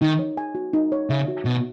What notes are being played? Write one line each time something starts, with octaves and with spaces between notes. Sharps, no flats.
D#3 D#4
C#5
G#5
F#4
D#4
C#5
C#3 E5
F#4
B2 F#4